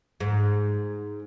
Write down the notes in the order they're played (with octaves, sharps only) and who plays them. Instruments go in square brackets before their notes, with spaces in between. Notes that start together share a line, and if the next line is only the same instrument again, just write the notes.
[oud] G#2